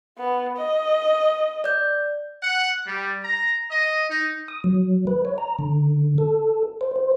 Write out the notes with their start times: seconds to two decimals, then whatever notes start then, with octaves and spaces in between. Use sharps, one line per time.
0.19 B3
0.58 D#5
1.64 D5 G6
2.42 F#5
2.87 G3
3.24 A#5
3.70 D#5
4.09 D#4
4.48 D#6
4.64 F#3
5.07 B4
5.25 C#5
5.38 A#5
5.59 D3
6.18 A4
6.81 C5
6.96 C5